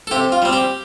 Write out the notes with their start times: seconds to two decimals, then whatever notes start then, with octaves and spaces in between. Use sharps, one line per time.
0.07 A4
0.11 C3 G4
0.32 F4
0.42 G3 C4
0.53 G4